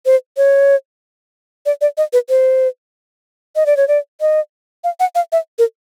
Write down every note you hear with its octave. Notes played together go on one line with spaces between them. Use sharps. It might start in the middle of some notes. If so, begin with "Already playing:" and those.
C5
C#5
D5
D5
D#5
B4
C5
D#5
D5
C#5
D5
D#5
F5
F#5
F5
E5
A#4